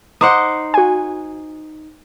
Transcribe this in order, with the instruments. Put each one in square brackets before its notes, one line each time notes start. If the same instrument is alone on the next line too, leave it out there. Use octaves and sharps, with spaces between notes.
[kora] D#4 C5 F#5 [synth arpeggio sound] D6
[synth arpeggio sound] F#4 G#5